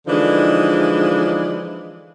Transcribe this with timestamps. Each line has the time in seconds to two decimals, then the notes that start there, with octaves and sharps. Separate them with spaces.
0.07 D3 E3 F3 G#3 D4 D#4